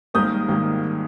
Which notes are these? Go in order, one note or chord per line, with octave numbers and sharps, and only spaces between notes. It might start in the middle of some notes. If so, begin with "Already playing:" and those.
G#1 G#2 D#3 G3 A#3 D#6 G6
G#1 G#2 D#3 G3 A#3